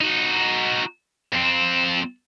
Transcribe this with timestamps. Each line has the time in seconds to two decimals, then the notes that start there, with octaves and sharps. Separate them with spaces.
0.01 D#4 F#4
1.33 F2 C4